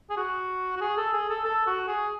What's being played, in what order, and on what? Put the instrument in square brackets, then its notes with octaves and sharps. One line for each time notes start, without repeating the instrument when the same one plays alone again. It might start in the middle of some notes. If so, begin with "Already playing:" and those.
[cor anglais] G#4
F#4
F#4
G#4
A4
G#4
A4
A4
F#4
G#4